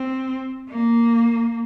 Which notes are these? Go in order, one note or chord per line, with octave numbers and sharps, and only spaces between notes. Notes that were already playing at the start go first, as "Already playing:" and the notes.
Already playing: C4
A#3